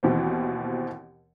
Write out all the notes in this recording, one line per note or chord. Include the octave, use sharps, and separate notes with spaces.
D#2 B2 E3 C4